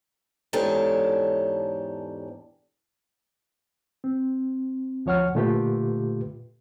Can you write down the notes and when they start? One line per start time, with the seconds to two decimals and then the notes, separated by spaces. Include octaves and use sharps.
0.53 E2 G#2 D4 G4 A4 C#5
4.04 C4
5.06 D2 F3 C#5 F#5 F6
5.35 A#2 D3 A3 F4 G4 B4